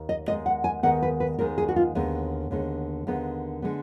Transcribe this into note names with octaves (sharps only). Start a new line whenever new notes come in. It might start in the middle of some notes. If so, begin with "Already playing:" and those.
Already playing: D#2
D#5
D#2 D#3 G#3 B3 D#5
F#5
G#5
D#2 D#3 G#3 B3 F#5
B4
B4
D#2 D#3 G#3 B3 A#4
G#4
F#4
F4
D#2 D3 G#3 B3
D#2 D3 G#3 B3
D#2 D3 G#3 B3
D3 G#3 B3